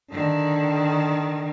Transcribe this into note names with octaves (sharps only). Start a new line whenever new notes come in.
D3 D#3